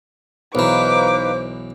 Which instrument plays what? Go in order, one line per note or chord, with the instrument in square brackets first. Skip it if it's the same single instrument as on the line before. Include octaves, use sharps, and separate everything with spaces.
[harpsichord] B1 E3 [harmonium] D#4 B4 F5 [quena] C5 [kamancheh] D6